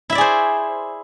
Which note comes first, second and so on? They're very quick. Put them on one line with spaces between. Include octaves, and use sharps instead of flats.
E4 E5 D5 G#4 C5